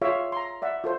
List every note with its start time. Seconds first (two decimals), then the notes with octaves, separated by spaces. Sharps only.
0.02 F4 G#4 C#5 E5 F5
0.32 A#5 C6
0.62 D5 E5 F#5
0.84 F4 A4 C5